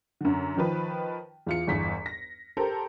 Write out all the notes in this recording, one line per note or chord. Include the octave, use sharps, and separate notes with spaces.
F#2 D3
D#3 F3 B4
E2 F4 C#7
G1 E2 B6
A#6
G4 A4 A#4 C5